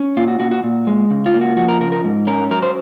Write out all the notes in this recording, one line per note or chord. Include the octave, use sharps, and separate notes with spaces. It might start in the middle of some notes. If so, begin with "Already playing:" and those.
Already playing: C#4
A#2 F4
F#4
A#2 F#4
F#4
A#2
G#3
C#3
F4
A#3
F#4
F3 F#4
A#4
C#3 A#4
A#4
G#2
C#4 A#4
F#3 A#4
C5